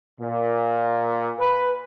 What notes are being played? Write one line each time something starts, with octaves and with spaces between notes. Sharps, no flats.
A#2
B4